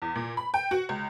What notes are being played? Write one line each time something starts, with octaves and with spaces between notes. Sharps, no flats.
E2
A#2
B5
G5
F#4
C#2